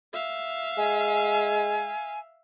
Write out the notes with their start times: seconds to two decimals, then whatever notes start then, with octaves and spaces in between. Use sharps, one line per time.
0.13 E5 F5
0.78 G#3 G#5